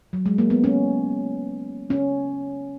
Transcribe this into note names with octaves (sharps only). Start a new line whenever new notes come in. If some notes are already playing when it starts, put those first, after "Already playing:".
F#3
G#3
A#3
B3
C#4
C#4